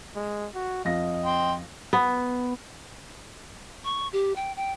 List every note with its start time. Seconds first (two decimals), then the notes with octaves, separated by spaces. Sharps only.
0.15 G#3
0.55 F#4
0.85 F2 D#5 F5 A#6
1.25 G5 C6
1.93 B3
3.84 C#6
4.13 G4
4.36 G5
4.56 G5